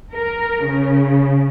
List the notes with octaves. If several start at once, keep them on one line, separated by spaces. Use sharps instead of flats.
A#4
C#3